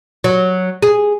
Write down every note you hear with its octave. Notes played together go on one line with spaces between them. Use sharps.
F#3
G#4